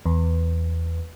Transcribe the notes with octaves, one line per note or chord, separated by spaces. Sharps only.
E2